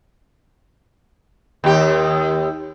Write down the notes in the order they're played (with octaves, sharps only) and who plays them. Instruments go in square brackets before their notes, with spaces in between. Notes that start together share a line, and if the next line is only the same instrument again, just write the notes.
[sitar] D#2 G4